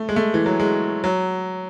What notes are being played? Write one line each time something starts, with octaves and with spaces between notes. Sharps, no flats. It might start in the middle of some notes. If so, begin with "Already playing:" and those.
Already playing: A3
G#3
A3
E3
F#3
G#3
F#3